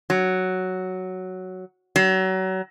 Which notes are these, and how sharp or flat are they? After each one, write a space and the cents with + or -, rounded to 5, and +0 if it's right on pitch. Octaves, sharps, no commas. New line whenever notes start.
F#3 +5
F#3 +30